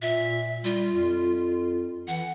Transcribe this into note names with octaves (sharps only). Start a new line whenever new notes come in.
A#2 E5
G3 F4
F2
E3 F#5